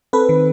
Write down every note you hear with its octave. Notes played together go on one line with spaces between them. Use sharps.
C4 A4 B4
D#3